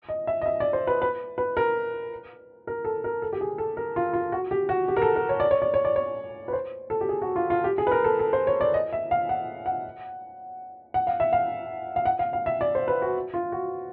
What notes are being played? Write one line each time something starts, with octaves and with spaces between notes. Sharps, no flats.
D#5
E5
D#5
E5
D5
C5
B4
B4
B4
A#4
A#4
A4
A#4
A4
G4
G#4
A4
A#4
F4
F4
F#4
G4
F#4
G4
A#4
A4
A#4
C#5
D5
C#5
D5
C#5
D5
C#5
B4
C5
A4
G4
G#4
F#4
F4
F4
G4
G#4
B4
A#4
A4
A4
C5
C#5
D5
D#5
E5
F5
F#5
F#5
F#5
F5
E5
F5
F5
F#5
F5
F5
E5
D5
C5
B4
F#4
F4
F#4